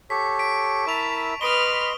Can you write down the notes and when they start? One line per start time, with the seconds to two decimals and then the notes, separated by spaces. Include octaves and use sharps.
0.10 G4 A4 C#5 B6
0.39 B6 D7
0.87 E4 A#4 E5 A5 C#6 F7
1.41 B4 D#5 B5 C6 D#6 F6 D7 G7